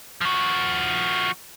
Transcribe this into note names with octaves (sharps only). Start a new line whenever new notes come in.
F3 F#4